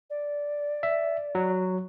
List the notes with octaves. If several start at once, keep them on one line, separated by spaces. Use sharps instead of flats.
D5
E5
F#3